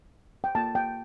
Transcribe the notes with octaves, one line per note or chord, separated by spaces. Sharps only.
G5
A#3 F4 A5
G5